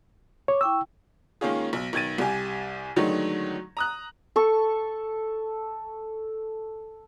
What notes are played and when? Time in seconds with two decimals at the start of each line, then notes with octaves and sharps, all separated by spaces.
0.48 C#5 D6
0.61 E4 G5 C#6 E6
1.41 D#3 G#3 A#3 C#4 F4 G#4
1.73 B1
1.93 B1 D#3 G#6 A6 D#7
2.18 C2 G4 G#5
2.96 D3 D#3 F#3 G#3 A3 D#4
3.77 A#5 D#6 F#6
4.36 A4 C#6